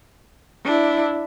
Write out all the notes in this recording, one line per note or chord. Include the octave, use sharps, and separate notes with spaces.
D4 E4